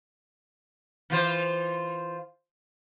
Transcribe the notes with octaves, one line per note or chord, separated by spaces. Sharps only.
E3 F4 C5